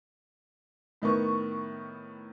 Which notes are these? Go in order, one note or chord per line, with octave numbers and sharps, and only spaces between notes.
A2 D#3 B3 C#6